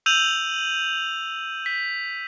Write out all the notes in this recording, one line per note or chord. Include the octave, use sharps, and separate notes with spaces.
E6 G6 D#7 F7 F#7
B6